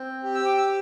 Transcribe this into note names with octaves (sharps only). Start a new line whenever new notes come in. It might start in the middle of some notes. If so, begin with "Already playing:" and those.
Already playing: C4
G4
E6
D6
E6